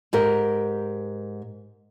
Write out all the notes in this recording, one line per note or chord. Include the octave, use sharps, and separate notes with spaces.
G#2 G4 A#4